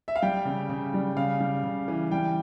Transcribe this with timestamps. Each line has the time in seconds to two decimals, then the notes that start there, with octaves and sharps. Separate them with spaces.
0.08 E5
0.16 F5
0.22 G3 G5
0.45 C#3
0.70 C#3
0.94 G3
1.16 C#3 F5
1.40 G3
1.64 C#3
1.88 E3
2.11 G3 G5